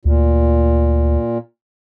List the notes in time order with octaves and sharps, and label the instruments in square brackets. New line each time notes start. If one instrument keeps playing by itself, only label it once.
[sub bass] D2 [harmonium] A#2